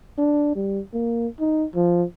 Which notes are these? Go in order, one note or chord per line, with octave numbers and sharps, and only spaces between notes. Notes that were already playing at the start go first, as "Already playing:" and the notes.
D4
G3
A#3
D#4
F3